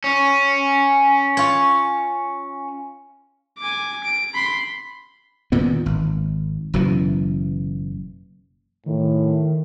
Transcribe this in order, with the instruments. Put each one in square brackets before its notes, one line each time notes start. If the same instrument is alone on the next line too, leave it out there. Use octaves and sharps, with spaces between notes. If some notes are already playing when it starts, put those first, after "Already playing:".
[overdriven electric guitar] C#4
[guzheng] F4 C#5
[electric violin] G#5 D6
D7
B5 C6
[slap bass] A#2 D#3 B3
G#1
F#1 F#2 B2 E3
[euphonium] A2 [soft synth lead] D#3